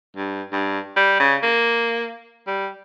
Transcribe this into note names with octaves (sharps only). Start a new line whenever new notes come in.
G2
G2
G3
C#3
A#3
G3